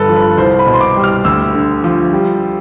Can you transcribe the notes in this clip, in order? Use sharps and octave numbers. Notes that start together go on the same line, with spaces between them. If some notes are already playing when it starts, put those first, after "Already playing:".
Already playing: G1 G2 D3 G3 A4 B4
F3
B4
C2 C5
B5
B2
C6
D6
G3
F6
D2 E6
D3
F3
G3